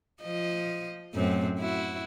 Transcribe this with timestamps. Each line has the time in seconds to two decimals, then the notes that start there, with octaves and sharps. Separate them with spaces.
0.23 F3 D#5
1.14 F#2 A2 C4
1.59 E4 F#4